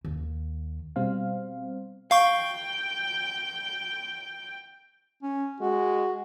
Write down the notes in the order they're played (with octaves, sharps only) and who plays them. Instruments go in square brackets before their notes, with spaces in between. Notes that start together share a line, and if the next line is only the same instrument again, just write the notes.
[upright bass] D#2
[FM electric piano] B2 G3 C4 C5 F5
[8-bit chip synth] F5 C#6 [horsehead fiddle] G5
[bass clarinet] C#4
[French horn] G#3 [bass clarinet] F#4